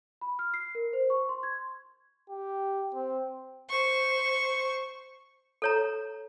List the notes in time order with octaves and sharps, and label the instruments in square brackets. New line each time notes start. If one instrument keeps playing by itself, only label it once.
[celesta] B5
F6
C7
A#4
C5
C#6
C6
G#6
[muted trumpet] G4
C4
[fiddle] C5 C#6
[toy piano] A4 C#5 A#5